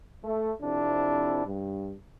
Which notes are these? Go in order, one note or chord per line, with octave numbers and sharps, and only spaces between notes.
A3
F2 C3 D4 E4
G2